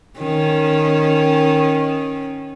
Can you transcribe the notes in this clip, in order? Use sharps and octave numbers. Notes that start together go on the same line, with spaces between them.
D#3 C#4